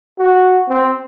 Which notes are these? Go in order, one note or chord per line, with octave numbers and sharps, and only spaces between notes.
F#4
C4